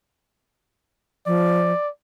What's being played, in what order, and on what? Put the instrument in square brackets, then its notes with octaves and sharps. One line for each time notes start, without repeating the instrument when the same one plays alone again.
[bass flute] F3 [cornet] D5